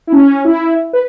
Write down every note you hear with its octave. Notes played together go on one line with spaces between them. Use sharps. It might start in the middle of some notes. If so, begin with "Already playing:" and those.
E4
C#4
E4
B4